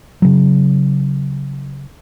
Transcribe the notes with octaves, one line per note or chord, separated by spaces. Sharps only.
C#3 F#3